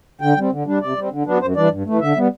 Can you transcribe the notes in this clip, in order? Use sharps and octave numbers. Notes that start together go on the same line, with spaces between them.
D3 G5
G3 C4
D3
G3 D4
C3 D5
G3 C4
D3
F#3 B3 D4
F#2 C5
E3 G3 D4 D5
G2
E3 A3
D3 E5
G3 B3